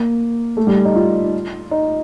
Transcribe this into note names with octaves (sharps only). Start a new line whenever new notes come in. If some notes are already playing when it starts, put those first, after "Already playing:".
Already playing: A#3
A3
G3
D#4
F4
D#4